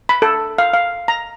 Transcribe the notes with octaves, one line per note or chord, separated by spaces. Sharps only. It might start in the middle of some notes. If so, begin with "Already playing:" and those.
B5
A4
F5
F5
A#5